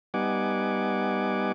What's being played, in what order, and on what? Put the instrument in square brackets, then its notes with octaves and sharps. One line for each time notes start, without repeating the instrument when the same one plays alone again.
[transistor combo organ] G3 B3 D#4 F#5 G#5 D6